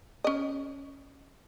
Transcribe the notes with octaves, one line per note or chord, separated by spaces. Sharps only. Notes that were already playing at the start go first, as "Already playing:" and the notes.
C#4 D#5